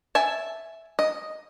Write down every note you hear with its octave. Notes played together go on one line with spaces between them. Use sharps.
E5 G#5 A5
D#5